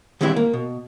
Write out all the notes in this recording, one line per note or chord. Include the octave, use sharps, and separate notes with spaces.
D#3 E3 G3 G#3 C4 E4
A#3
B2